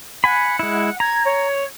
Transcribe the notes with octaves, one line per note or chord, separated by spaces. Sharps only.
F#5 G#5 B5
G#3 E4
A#5 G#6
C#5